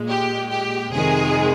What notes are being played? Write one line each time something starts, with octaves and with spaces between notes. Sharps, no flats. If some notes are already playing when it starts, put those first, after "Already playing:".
Already playing: A#2 G#3
G4
G4
F2 C3 D#3 G#3 G#4